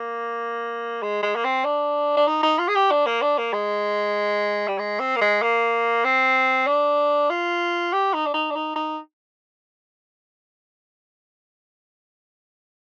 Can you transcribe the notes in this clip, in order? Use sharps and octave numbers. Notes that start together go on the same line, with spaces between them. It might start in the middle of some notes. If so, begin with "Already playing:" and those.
Already playing: A#3
G#3
G#3
A#3
C4
D4
D4
D#4
D#4
F4
G#4
G4
D4
A#3
D4
A#3
G#3
G3
G#3
C4
A#3
G#3
A#3
C4
D4
F4
G4
D#4
D4
D#4
D4
D#4
D#4